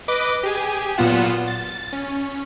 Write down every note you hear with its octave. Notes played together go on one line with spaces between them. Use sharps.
B4 D#5 D6
G4 G#4 G#5
A#2 F#3 B3 F4 F#5 E7
A6
C#4